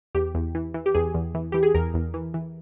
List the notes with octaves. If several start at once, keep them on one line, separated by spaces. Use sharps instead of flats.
E2 G4
E2
E3
E3
G4
E2 G#4
E2
E3
E3 G4
G#4
E2 A#4
E2
E3
E3